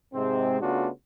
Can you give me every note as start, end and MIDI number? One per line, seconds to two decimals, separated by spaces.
0.14 0.60 44
0.14 0.60 48
0.14 0.60 56
0.14 0.60 60
0.61 0.89 49
0.61 0.89 57
0.61 0.89 59
0.61 0.89 62
0.61 0.89 65
0.61 0.89 66